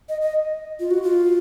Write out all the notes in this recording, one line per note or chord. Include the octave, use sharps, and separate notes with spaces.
D#5
D#5
F4
F#4
F4